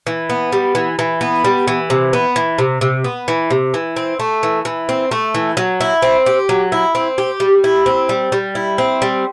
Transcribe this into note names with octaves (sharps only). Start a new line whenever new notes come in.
E3
B3
G3
E3
E3
B3
G3
E3
C3
B3
E3
C3
C3
B3
E3
C3
E3
C4
A3
E3
E3
C4
A3
E3
F#3
E4
C4
G4
F#3
E4
C4
G4
G3
E4
C4
G3
G3
E4
C4
G3